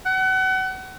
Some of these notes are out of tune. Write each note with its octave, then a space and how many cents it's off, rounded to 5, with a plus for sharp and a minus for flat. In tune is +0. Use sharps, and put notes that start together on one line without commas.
F#5 +30